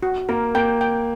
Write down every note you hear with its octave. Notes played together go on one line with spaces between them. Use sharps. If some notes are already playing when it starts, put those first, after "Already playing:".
F#4
A#3 A#4
A#3 G5
G5